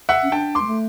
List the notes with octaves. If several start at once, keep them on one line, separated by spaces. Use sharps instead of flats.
E5 F#5
C#4
D4 G5 A5
C6 D6
G#3
A3